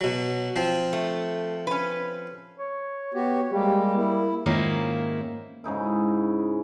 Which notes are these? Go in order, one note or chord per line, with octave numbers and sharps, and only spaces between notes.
B2 F#3
F3 C4
A3
C#4 B4
C#5
B3 F#4 G4
G3 G#3 A#3 G4
A#3 E4
G#2 D#3 A#3 C#4 E4 F4
G#2 C#3 D#4 E4